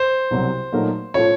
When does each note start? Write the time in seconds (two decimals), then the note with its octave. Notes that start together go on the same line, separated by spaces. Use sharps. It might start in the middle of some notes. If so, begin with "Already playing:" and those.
Already playing: C5
0.31 C2 C3 F#3
0.72 A#2 F#3 A3 D#4 A#4
1.14 A2 F3 A3 C#4 F4 C#5